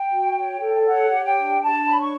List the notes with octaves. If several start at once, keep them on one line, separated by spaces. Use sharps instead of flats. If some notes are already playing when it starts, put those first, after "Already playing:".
Already playing: G5
F#4
C#5
A4
C#5 F#5
G4
G5
D4
D4 A5
C#5 B5
C#6